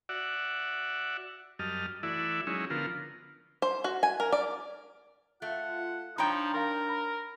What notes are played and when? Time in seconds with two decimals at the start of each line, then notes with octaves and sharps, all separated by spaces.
0.09 F#4 D5 E5 F#5
1.59 F#2 G3 D#5 A5 F6
2.03 E3 A3 E4 F#4 D5 E5
2.47 F#3 G#3 C#4 D#4 E4
2.70 D3 F3 B3 F4 A#4
3.62 C5
3.84 F#4
4.03 G#5
4.20 A#4
4.33 D5
5.42 A3 F4 F#5
6.18 F3 D4 D#4 C#5 G5 B5 C6 G6
6.54 A#4 F5 C6
6.89 B5